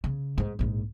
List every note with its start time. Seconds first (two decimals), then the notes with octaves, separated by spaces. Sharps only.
0.04 C#3
0.38 G#2
0.59 A#1 G#2